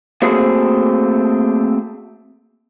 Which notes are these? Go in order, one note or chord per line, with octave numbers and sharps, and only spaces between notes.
A3 A#3 C4 F#4 G#4